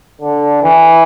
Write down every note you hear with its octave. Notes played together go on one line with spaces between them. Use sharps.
D3
E3